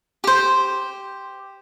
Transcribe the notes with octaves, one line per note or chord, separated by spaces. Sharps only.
G4 C5